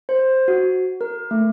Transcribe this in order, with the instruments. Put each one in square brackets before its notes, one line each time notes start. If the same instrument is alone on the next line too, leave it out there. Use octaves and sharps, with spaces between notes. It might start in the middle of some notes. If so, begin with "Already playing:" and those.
[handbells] C5
F#4
A#4
A3